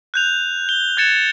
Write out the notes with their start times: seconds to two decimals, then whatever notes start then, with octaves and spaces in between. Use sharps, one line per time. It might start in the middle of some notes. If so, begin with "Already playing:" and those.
0.14 F#6 G6 F7
0.69 G7
0.97 F#6 G#6 A6 C#7 E7